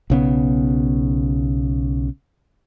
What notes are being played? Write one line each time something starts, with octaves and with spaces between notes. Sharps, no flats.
B1 C#3 B3